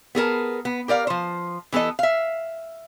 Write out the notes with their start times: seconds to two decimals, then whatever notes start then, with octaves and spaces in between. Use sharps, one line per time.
0.15 B3 G#4 A#4 A5
0.65 B3
0.88 G4 A#4 D5 F5
1.07 F3 C5
1.72 E3 B3 A4 B4 D#5
1.99 E5 F5